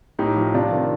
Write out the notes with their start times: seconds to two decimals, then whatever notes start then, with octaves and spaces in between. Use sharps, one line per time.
0.19 A2 D#4 G4
0.36 F3
0.54 C3 D4 F4
0.72 D#3